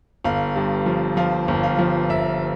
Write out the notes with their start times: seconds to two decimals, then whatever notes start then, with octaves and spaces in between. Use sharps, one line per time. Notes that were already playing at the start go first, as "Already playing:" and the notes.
0.24 G1 F5
0.56 G2
0.86 F3
1.17 F3 F5
1.48 G1
1.63 F5
1.79 F3
2.10 G1 E5